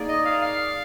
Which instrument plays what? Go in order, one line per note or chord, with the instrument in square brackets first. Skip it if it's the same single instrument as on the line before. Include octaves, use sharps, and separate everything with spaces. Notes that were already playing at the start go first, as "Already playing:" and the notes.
Already playing: [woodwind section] A#3 D#4 G#4 D5
[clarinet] D#5
F5
F5